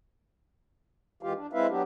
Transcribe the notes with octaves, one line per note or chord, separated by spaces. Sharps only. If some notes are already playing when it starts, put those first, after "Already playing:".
F2 E3 G#3 F4 G4 F5
D4
G#3 C4 E4 B4 E5 F5
F#3 B3 D4 G4